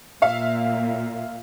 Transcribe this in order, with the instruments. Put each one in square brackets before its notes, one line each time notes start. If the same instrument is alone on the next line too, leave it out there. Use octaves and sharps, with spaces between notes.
[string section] A#2 [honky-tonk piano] E5 F5